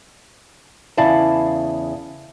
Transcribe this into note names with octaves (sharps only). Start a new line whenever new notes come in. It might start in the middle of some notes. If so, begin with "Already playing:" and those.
E2 C#3 E4 D5 F5 A5